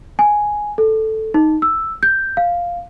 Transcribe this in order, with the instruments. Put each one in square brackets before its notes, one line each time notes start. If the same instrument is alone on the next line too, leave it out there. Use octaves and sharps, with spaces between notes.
[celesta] G#5
A4
D#4
E6
G6
F5